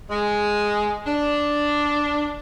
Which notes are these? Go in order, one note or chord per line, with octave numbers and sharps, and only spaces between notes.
G#3
D4